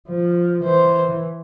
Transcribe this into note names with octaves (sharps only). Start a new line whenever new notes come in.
F3
E3 C5